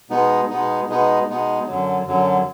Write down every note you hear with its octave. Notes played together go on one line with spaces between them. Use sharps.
B2 G#3 B3 D#4
B2 G#3 B3 D#4
B2 G#3 B3 D#4
B2 G#3 B3 D#4
F#2 D3 F#3
F#2 D3 F#3